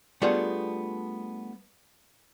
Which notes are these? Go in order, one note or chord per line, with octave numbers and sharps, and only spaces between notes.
G3 A3 B3 D4 F4 G#4